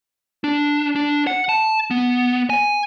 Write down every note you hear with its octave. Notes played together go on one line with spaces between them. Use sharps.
D4
D4
F#5
A5
B3
G#5